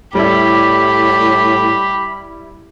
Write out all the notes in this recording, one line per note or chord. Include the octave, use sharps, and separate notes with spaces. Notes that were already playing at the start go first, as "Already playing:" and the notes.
A2 G3 E4 G4 B5